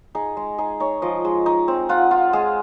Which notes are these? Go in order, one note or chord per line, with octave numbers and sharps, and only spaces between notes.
D#4 G#4
G#3
D#4 G#4
D#4 C#5
F3 D#5
G#3
D#4
C4
F4 F#5
F4
G#3 G#4